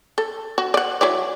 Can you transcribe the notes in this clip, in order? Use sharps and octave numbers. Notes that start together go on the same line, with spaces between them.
A4
F#4
D5 F#5
F#3 E4 D5